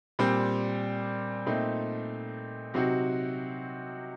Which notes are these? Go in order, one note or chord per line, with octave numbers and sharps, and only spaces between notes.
A#2 G3 C4
A#2 A3 C4 D#4
C3 F#3 C4 D#4 F#4